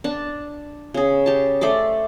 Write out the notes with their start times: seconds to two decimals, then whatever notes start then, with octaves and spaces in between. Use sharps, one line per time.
0.04 D4 A5
0.94 C#3 G#4
1.26 G4 A5
1.61 A3 C5 D5 D6